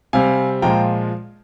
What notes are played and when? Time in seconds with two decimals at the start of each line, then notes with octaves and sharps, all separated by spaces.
0.13 C3 G3 C4 F5 G#5
0.62 A#2 F3 G#3 G5 A#5